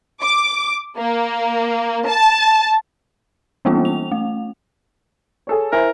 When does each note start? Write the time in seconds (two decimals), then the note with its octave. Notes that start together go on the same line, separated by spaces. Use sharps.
0.22 D6
0.97 A#3
2.06 A5
3.65 E3 G3 A#3 B3 C#4 F4
3.85 F7
4.11 A3
5.47 G#4 A4 C#5
5.72 E4 A#4 C5 G#5